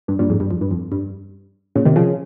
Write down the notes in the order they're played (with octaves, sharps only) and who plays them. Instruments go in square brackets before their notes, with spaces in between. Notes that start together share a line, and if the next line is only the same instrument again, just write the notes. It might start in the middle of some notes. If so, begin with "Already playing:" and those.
[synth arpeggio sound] G2
G2 A#2
F2 G#2
G2
F2
G2
F2
G2
A#2 C#3
C3 D#3
C#3 F3